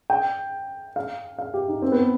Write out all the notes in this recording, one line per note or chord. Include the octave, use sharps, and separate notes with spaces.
G5
F5
F5
G4
D#4
C4
B3